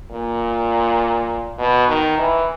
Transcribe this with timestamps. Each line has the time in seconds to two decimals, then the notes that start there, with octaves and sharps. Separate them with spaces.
0.10 A#2
1.58 B2
1.88 D#3
2.18 E3